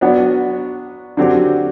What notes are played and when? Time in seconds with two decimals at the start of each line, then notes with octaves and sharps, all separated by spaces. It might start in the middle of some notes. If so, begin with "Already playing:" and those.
0.01 F#3 B3 D4 F#4
1.17 D3 F#3 C4 G4